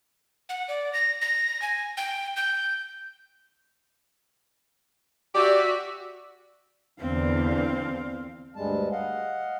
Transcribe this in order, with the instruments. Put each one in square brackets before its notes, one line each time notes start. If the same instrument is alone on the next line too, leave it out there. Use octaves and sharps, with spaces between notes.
[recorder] F#5
D5
A#6
A#6
G#5
G5
G6
[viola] F#4 E5 [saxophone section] G4 D5
[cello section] E2 D3 [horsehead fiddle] C4 F5
[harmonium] D2 G2 G3 G#3 A5
D#5 F5 F#5